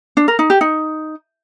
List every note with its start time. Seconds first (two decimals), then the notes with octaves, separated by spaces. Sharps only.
0.17 D4
0.28 A#4
0.39 D#4
0.50 G4
0.61 D#4